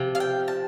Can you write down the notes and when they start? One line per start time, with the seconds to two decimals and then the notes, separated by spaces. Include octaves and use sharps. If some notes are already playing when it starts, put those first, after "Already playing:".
Already playing: C3 F3
0.15 F5
0.20 G5
0.48 A5